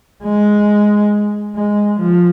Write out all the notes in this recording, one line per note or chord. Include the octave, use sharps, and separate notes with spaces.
G#3
G#3
F3